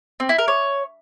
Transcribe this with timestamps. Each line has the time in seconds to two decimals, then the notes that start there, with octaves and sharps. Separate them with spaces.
0.20 C4
0.29 E4
0.38 A#4
0.48 C#5